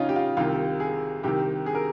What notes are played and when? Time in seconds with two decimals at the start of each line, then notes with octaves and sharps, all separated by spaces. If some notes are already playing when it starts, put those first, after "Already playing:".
Already playing: C#3 C#4 D#4 F4
0.09 G4
0.16 F4
0.37 C2 C3 D#3 F4
0.80 G#4
1.23 C2 C3 D#3 G4
1.66 G#4
1.75 A#4